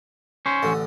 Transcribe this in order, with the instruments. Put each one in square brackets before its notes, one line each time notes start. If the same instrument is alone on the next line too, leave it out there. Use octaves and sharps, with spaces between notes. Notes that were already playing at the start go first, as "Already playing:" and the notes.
[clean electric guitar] C#4 C5
[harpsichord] A1 D3